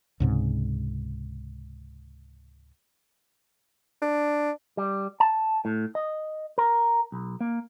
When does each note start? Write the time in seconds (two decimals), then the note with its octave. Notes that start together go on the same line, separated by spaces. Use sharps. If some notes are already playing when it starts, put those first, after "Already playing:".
0.20 C#2 G#2 C3
4.02 D4
4.77 G3
5.20 A5
5.65 A2
5.95 D#5
6.58 A#4
7.12 B1
7.41 A#3